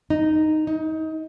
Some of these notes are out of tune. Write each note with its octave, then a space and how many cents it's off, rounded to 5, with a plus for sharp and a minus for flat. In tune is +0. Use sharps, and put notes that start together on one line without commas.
D#4 -5
D#4 +25